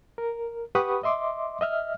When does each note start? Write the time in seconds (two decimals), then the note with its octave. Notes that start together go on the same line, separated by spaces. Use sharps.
0.18 A#4
0.75 G4 B4 F#5 B5 C#6 D#6
1.03 D#5 E5 C6 D6
1.61 D#5 E5 F6